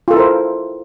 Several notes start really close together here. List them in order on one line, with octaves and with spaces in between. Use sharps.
F4 A4 E4 A#4 C5